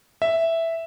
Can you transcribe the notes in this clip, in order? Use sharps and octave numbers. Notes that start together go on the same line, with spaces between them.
E5